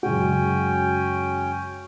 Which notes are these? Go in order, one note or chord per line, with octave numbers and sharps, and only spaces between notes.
F#2 C#3 G#3 C#4 F#4 G5